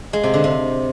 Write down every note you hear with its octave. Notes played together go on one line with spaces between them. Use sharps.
G#3
C3
D3
C3